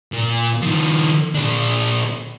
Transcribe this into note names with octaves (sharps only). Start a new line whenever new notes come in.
A#2
D#3 F3
A#2 D4